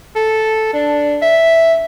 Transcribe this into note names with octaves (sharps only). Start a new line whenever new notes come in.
A4
D4
E5